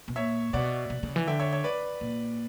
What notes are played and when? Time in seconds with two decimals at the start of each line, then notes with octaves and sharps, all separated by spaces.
0.08 B2
0.16 A#2 C#5 E5
0.53 B2 D5 F#5
0.90 B2
1.03 C#3
1.16 E3
1.27 D3 E5 G5
1.39 C#5 E5
1.52 C#5 E5
1.64 B4 D5
2.01 A#2